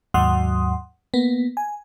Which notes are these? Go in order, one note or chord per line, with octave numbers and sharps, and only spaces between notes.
D#2 G#2 F#3 F#5 C6 D#6
A#3 B3
G#5